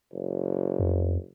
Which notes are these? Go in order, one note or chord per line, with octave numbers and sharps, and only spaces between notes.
F#1
F2